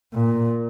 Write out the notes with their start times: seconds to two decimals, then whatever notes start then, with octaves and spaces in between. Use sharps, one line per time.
0.13 A#2